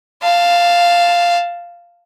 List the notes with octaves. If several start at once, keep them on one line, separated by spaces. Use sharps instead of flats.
F5 A5